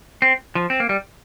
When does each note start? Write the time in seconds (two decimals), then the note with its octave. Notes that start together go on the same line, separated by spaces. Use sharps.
0.22 C4
0.55 F3
0.70 C4
0.80 A#3
0.89 G3